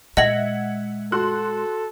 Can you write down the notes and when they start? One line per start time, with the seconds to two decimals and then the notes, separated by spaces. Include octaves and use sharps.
0.17 A#2 G#3 D#5 E5 F#5 G#6 A#6 F#7
1.12 F#4 A4 C6 F#6